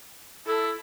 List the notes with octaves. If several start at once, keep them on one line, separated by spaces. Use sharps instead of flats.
E4 A4